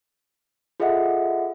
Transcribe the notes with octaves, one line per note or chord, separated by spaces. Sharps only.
F4 G#4 A4 D#5 E5 F#5